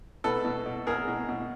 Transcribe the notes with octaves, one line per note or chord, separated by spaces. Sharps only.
B2 A4 B4
B2
B2
B2 G#4 A#4
B2
B2